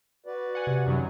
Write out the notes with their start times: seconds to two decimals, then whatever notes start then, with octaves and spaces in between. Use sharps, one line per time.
0.26 F#4 B4 D5
0.55 F#5 G#5
0.67 C3
0.86 F#2 D#3 F#3